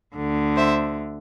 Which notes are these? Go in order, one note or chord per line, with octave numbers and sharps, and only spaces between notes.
D2 D3
C5 E5